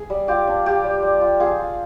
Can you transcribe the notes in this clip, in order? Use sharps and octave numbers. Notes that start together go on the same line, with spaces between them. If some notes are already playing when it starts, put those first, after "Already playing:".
Already playing: G#4
G3
F4 G4
D4
F4 G4
G3
G3
F4
F4 G#4
F4